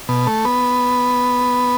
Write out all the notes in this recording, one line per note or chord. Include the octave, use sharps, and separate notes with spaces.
B2
A3
B3